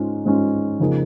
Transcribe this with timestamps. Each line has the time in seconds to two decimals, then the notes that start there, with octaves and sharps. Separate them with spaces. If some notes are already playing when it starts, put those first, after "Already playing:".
Already playing: G#2 G#3 C#4 F4
0.25 G#2 G#3 C#4 F4
0.79 F2 C#3 A#3 D#4 G#4